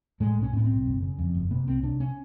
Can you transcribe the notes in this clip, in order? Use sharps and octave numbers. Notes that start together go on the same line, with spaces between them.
A2 G#3
B1
C#4
A2 B3
C4
B1
F#1
C#3
F2
F#1
C3 B3
C2 C4
C3 D4
C#4